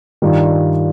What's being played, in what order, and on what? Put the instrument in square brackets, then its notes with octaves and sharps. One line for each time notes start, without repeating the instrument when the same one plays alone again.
[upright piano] G2 D#3 G3 D4 F4